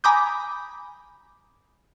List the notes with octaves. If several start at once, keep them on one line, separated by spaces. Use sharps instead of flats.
G#5 A#5 B5 D6 D#6 G6